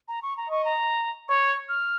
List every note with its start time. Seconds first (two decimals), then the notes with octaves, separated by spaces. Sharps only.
0.08 A#5
0.22 C#6
0.37 A#5
0.49 D#5 C#6
0.65 A#5
1.29 C#5 C#6
1.69 F6